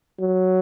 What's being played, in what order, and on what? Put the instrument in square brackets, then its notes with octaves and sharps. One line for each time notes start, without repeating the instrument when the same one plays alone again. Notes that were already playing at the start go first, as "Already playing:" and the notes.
[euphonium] F#3